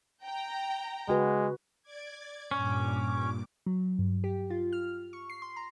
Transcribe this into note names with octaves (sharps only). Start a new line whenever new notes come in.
G5 A#5
C#3 G#3 F#4 B4
D5 D6 G#6
G2 A#2 C#4 D6
F#3
G2
G4
F4
F6
C#6
C7
C6
A#5